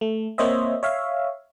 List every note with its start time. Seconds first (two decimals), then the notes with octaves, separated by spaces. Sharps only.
0.01 A3
0.38 A#3 C4 C5 C#5 D#5 E5
0.83 C#5 E5 F5